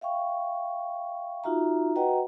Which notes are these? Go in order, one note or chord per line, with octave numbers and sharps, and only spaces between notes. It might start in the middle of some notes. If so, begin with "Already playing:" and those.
E5 F5 G5 C#6
D#4 F4 F#4 E5 A#5
F#4 B4 D#5 F#5 G5 A#5